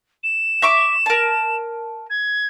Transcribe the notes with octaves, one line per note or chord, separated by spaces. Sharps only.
E7
E5 C#6 D6
A#4 A5
G#6